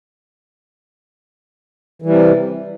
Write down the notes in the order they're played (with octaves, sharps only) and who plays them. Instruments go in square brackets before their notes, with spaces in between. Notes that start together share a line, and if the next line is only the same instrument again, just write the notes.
[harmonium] E3
G3
C3